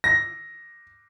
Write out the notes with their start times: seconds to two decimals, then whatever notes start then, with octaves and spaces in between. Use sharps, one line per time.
0.04 A#6